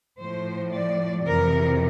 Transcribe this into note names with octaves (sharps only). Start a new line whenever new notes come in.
A2 F3 C5
D5
F2 C3 E3 A#4